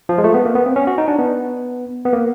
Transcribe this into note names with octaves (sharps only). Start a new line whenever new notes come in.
F3
G#3
A3
B3
A#3
B3
C4
C#4
F#4
D#4
D4
B3
B3
A#3